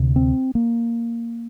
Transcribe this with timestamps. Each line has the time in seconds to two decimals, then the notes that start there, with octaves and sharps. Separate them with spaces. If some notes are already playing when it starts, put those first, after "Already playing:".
Already playing: D2 C3
0.16 C4
0.55 A#3